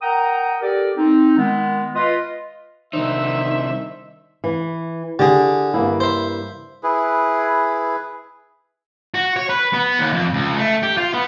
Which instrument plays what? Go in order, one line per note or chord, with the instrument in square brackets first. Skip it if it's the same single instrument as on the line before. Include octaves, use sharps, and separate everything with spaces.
[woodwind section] A#4 F#5 G5 A#5 D#6
G4 A4 A#4 D5
C4 D#4
D#3 G#3 B3
F4 B4 D#5
[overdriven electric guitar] C2 D#4 [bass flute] D#3 [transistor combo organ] D4 C5 E6 [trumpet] E5
[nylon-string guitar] E3
[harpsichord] D3 G#4 [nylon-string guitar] G4
[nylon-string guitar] G2 A#3 E4
[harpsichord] C5 E5
[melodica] E4 G#4 B4
[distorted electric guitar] F#4
C#5
B4
B3
D#2
F2
C#2
A3
G4
F4
B3